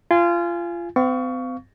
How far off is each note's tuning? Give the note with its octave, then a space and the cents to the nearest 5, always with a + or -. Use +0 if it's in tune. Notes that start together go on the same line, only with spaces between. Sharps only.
F4 -25 G#5 +0
C4 -40 F5 +0 C#6 +20